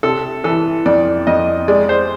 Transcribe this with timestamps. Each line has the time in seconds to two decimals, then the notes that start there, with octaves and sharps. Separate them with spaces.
0.03 C3 A4
0.44 E3 A4
0.86 F2 D5
1.27 F2 D#5
1.68 G#3 D5
1.89 C5